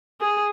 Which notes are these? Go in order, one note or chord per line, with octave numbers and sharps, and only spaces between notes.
G#4